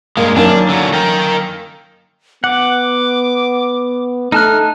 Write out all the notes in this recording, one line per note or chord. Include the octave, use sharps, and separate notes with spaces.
G2 G#3 A#3
F#2 D#3 A#3 D4
D3 F#3
A#4 G5
B3 F#5 D6
A3 D#4 A5 F6 F#6